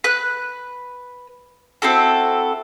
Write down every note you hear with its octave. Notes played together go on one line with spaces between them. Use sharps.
B4 F#6
C4 E4 F#4 A4